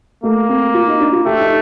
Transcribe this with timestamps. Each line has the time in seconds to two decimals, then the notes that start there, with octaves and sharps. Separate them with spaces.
0.23 A3 A#3
0.49 C4
0.74 F4
0.88 D#4
1.00 D4
1.13 F4
1.25 A3 G4
1.41 D#4